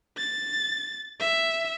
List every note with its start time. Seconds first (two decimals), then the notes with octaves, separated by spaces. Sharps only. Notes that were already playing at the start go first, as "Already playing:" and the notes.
0.18 A6
1.20 E5